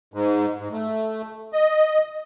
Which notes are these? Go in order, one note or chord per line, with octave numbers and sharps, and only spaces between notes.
G#2
G#2
A3
D#5